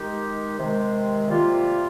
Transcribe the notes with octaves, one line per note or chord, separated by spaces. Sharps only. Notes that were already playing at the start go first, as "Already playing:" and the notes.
Already playing: D#3 G#3 D#4 G4
C3 D#3 G#3
C3 G3 A#3 F4